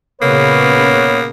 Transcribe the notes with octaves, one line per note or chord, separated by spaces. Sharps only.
A#2 C#3 A#3 B3 B4 C#5